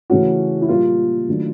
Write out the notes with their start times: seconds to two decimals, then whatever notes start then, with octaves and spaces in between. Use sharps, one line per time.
0.10 C#3 E3 A3 C#4 F#4
0.62 E4
0.69 A#2 G3 A#3 F4
1.28 D#3 F#3 A3 D4